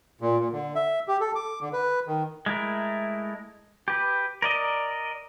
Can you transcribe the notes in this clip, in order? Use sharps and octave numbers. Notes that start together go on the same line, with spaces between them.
A#2
A#2
D3
E5
G4
A4
D6
D3
B4
D#3
G#3 A3 E4 A#4
G4 B4
A#4 D5 D#5